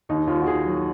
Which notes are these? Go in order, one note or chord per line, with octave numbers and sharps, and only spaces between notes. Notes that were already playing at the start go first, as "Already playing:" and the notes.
D#2 D#4
D#2 F4
F#4
D#3 G#4
F#3